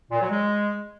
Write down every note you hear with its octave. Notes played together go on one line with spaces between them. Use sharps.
A#2
F#3
G#3